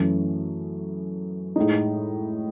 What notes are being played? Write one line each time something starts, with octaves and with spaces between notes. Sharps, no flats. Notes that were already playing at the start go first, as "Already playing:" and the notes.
Already playing: F#2 E3 A3 C#4 E4
A2 G#3 D#4